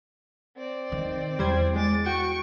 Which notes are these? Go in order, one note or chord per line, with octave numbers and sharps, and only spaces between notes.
C4 D5
D#3
E2 G3 C5 G#6
G#3 D6 A6
F#4 G5 C#6 D7